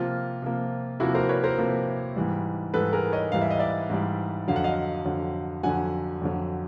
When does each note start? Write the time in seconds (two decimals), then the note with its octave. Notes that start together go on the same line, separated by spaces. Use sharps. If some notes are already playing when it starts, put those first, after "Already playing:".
Already playing: C3 F3 A#3 F4
0.42 C3 F3 A#3
1.00 C3 F3 A#3 E4 F#4
1.15 A#4 C5
1.29 B4 C#5
1.44 A#4 C5
1.58 C3 F3 A#3
2.16 G#2 E3 G3
2.74 G#2 E3 G3 A4 B4
2.93 G#4 A#4
3.12 C#5 D#5
3.32 G#2 E3 G3 F5
3.42 E5
3.50 D#5
3.59 D5 E5
3.90 G#2 E3 G3
4.48 F2 D3 F#3 F5
4.56 F#5
4.64 D#5 F5
5.05 F2 D3 F#3
5.63 F2 D3 F#3 F#5 G#5
6.22 F2 D3 F#3